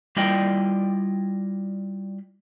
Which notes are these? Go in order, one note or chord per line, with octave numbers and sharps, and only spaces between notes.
G3 E4 F4 D5 D#5 G5